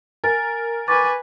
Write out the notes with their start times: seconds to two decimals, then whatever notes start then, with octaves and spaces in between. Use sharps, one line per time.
0.24 A#4 G#5 A6
0.88 B4 G#5 C#6 D6 A6